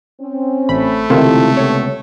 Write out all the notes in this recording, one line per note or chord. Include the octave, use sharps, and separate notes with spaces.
C4 C#4
A1 A3 B5
C#2 C3 D#3 E4 F4 G4 A4
A#2 B3 A4 C#5